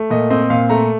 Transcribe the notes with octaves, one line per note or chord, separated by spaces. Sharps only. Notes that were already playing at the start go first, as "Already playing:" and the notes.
Already playing: A3
A#2 D#5
C4 D#5
A#2 F5
A3 A#5